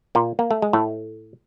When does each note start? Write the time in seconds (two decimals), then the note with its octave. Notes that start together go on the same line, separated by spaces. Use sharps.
0.15 A#2 A#3
0.39 A#3
0.51 A3
0.62 G#3
0.73 A2 A3